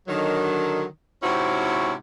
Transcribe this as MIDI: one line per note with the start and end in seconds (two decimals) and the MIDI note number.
0.08 0.85 50
0.08 0.85 51
0.08 0.85 54
1.23 1.93 44
1.23 1.93 48
1.23 1.93 60
1.23 1.93 61
1.23 1.93 64
1.23 1.93 66